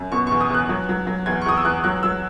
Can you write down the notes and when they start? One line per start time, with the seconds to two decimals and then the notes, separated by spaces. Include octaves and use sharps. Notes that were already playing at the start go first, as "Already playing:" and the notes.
Already playing: F#2
0.12 B2 C#6
0.27 C#6
0.32 E2
0.41 D#6
0.50 E2 F#6
0.69 F#3
0.89 F#3
1.07 F#3
1.26 E2 G#6
1.42 C#6
1.46 E2 D#6
1.57 E6
1.65 E2 F#6
1.84 F#3 F#6
2.03 F#3 E6